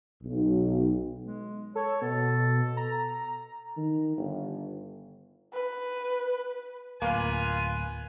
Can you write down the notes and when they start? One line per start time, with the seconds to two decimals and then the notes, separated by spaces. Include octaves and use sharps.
0.24 B1
1.25 G#3
1.75 A4 C#5
2.02 B2 A4
2.77 A#5
3.77 D#3
4.17 G1
5.53 B4
7.02 D1 A#3 F4 B4 G#5